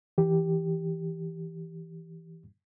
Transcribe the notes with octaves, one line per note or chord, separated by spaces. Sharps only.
E3 G4